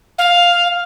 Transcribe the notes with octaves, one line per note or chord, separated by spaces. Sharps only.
F5